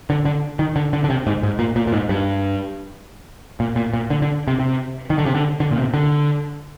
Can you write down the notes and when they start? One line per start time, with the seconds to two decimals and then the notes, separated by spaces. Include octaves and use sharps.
0.10 D3
0.25 D3
0.59 D#3
0.76 D3
0.93 D3
1.04 D3
1.10 C3
1.27 G#2
1.43 G#2
1.59 A#2
1.76 A#2
1.87 A#2
1.93 G#2
2.09 G2
3.60 A#2
3.76 A#2
3.93 A#2
4.10 D3
4.22 D3
4.48 C3
4.60 C3
5.10 D#3
5.18 D3
5.26 C3
5.35 D3
5.60 D3
5.71 A#2
5.78 C3
5.94 D3